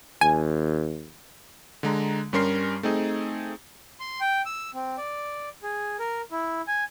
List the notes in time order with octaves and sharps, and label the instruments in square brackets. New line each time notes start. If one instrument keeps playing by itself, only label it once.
[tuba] D#2 [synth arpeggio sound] G#5
[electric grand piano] D3 G#3 A#5
G2 G3 C#4 A#4 C6 C7
A3 C4 D#4 G#4
[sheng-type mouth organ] C6
G5
E6
C4
D5
G#4
A#4
E4
G#5